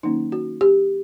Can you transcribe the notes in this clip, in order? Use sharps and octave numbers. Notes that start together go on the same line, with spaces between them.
D#3 F#3 A#3 C#4 D#4
F#4
G4